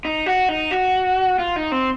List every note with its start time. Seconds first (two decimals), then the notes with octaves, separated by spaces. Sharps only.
0.05 D#4
0.26 F#4
0.49 D#4
0.71 F#4
1.39 F4
1.56 D#4
1.72 C4